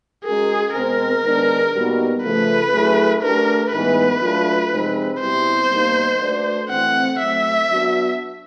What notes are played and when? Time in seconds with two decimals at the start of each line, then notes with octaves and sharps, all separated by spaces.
0.25 G#3 C#4 F#4 G#4 A#4
0.74 B2 G#3 C4 A#4
1.24 D#3 G#3 B3 D4
1.74 A#2 G3 B3 D#4 F#4
2.23 C#3 F3 A3 B4
2.73 F#3 A3 C#4 E4 G#4
3.23 A3 D4 G4 A#4 B4
3.72 A2 E3 G#3 B3 D#4 B4
4.22 F#3 A3 D4 F4
4.71 C3 F3 G#3 C4 D#4
5.21 B2 G3 C4 E4 G4 C5
5.71 B2 G3 A#3 D#4
6.21 A3 D4 F#4 B4 D5
6.70 E3 A3 C4 F#5
7.19 F#3 A3 C4 E5
7.69 F#3 B3 D4 F#4